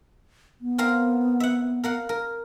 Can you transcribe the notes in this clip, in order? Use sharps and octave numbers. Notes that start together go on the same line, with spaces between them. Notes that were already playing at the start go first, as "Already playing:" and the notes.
B3
C4 A#4 F5
E5 F#5
A#4 F5 F#5
A#4